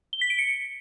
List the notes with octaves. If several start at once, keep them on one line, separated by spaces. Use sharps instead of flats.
G7
B6
D7
C#7